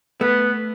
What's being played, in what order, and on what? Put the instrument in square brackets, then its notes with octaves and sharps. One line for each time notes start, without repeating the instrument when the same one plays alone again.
[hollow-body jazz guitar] A3 [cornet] B3